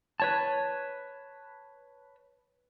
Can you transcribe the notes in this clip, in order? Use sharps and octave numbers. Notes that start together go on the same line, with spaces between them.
B4 C#5 A5